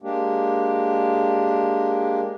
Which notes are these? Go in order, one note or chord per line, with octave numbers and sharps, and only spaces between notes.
G#3 A#3 D4 G4